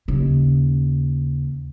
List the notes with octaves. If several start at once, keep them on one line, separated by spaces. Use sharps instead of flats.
D#2 C#3